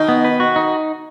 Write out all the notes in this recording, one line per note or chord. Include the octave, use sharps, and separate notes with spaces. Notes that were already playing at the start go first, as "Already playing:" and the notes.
Already playing: B2 D#3 D#4
B3
B4
F#4
D#4